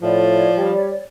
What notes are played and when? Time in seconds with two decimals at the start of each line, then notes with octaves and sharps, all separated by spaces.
0.02 A2 F3 C#5 D5
0.57 G3